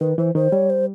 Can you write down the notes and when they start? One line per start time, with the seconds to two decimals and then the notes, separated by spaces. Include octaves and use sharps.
0.01 D#3 B4
0.18 E3 C5
0.35 D#3 C5
0.52 G3 C#5
0.70 C5